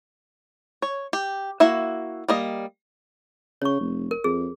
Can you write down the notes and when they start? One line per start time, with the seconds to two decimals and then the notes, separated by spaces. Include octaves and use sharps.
0.82 C#5
1.13 G4
1.60 A#3 E4 F#4 E5
2.28 G3 A#3 D#5
3.62 C#3 C#5 C#6
3.80 F1
4.11 A#4
4.24 F2 G#4